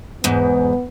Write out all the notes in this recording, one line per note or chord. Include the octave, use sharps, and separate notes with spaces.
E2 G#2 B3